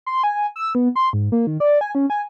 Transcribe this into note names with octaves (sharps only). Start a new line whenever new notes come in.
C6
G#5
E6
B3
C6
G#2
A#3
D#3
D5
G#5
C#4
G#5